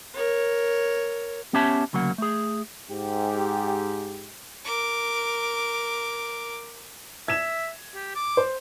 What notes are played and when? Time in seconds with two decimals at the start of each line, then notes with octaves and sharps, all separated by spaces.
0.15 A#4 C#5
1.53 B3 C#4 G4 C#5 E5 A5
1.93 D2 C#3 F#3 A#3 F#5
2.18 A3 G#4
2.89 G#2 G4
4.65 A#4 D6
7.28 E5 G#6 E7
7.95 G4
8.15 D6
8.37 C5